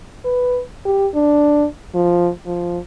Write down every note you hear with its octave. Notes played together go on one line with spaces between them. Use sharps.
B4
G4
D4
F3
F3